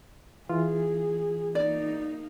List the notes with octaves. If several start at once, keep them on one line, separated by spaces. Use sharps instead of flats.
E3 F4 G#4
A#3 D#4 D5